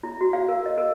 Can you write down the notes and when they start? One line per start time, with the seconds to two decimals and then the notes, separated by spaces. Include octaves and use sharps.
0.03 E4
0.21 F#4
0.33 F5
0.49 A#4
0.66 D#5
0.78 A#4